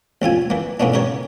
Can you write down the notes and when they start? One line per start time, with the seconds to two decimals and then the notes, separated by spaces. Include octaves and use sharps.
0.22 A1 C4 F4 G#5
0.50 E3 A#3
0.80 A2 A#3 B3 C#4 D4
0.94 C#3 G4 A#4 C#5